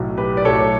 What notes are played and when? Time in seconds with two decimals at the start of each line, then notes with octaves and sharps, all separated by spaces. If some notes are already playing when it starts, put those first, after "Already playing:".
Already playing: B1 A2 F#3
0.17 G4 B4
0.37 D5
0.45 B1 A2 F#3 A4 C#5